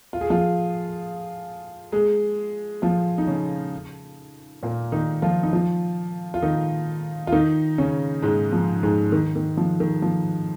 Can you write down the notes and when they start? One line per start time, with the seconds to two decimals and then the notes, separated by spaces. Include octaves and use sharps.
0.13 F4
0.21 G#4
0.30 F3 F4
1.92 G#3 G#4
2.82 F3 F4
3.18 D#4
3.27 C#3 C#4
4.63 A#2 A#3
4.92 D#3 D#4
5.22 F3 F4
5.43 D#4
5.53 F3 F4
6.34 F4
6.43 D#3 D#4
7.27 F4
7.32 D#3 D#4
7.78 C#3 C#4
8.22 G#2 G#3
8.52 F3
8.83 G#2 G#3
9.12 D#3
9.35 D#3
9.57 F3
9.80 D#3
10.02 F3